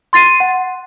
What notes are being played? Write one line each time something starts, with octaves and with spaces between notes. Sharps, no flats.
C6 A6 C7 D#7
F#5